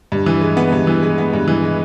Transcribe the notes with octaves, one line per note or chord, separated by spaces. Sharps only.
G2
E3
G#3
B3
G2
E3
G#3
B3
G2
E3
G#3